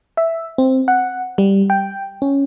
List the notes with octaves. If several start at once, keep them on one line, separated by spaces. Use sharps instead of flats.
E5
C4
F#5
G3
G5
C#4